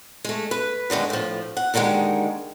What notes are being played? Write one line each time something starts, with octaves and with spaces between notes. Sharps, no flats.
G#3 A3
B4
A2 D3 D#3 G#3
A2 F3
F#5
D#2 D3 D#3 F#3 G#3